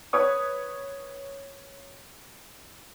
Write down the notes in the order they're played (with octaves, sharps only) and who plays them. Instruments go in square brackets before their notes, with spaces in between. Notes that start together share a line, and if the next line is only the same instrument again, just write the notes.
[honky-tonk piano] B4 C#5 C#6 D#6